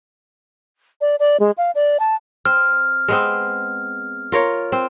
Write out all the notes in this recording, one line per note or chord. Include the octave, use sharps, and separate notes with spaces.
D5
D5
G#3
F5
D5
A5
C4 F6
G#3 B3 C4
F4 A#4 C#5
C4